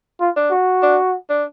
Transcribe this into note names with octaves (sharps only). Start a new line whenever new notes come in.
F4
D4
F#4
D4
D4